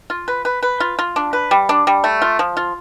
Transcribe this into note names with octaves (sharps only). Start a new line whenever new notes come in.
F4
B4
B4
B4
F4
F4
D4
B4
G3
D4
G3
A3
F4
F3
F4